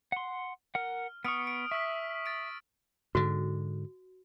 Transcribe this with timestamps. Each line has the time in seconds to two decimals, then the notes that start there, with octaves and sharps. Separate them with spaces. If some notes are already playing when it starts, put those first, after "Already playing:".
0.12 F#5 C6
0.75 A#4 F#5 F6
1.25 B3 C#6 D#6 F6 D7
1.47 D7
1.71 E5 C#6 E6 B6
2.26 A6 D7
3.15 G#2 D3 F#4